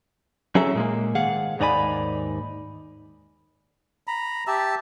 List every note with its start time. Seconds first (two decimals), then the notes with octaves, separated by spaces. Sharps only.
0.55 F#3 C#4 G#4 A4 E5 A#5
0.75 A#2 G#3 A#3
1.15 G#2 D#3 G#4 F5 F#5
1.59 D#2 G#2 D#4 D5 G#5 B5
4.07 A#5 B5
4.47 G4 E5 A5 E6